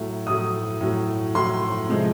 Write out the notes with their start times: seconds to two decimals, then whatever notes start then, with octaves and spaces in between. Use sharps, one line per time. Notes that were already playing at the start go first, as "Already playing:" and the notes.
Already playing: A2 F#3 A3
0.26 A2 F#3 A3 D#6
0.81 A2 F#3 A3
1.34 A2 F#3 A3 C6
1.89 C3 F3 G#3